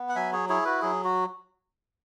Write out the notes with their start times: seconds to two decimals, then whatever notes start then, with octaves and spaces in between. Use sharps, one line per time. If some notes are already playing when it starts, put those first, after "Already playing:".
Already playing: B3
0.09 F#5
0.15 F#3 E5 G#5
0.32 G#4 C#5
0.49 E4 G#4 C#5
0.65 F#4 B4
0.82 F#3 G#4
1.04 F#4